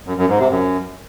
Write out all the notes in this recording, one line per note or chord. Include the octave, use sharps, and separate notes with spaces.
F#2
F#2
G#2
C3
F#2